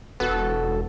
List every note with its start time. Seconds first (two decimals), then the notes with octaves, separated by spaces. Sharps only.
0.20 E1 B3 F#4 A4